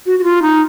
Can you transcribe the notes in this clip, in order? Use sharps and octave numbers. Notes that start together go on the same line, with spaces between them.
F#4
F#4
F4
D#4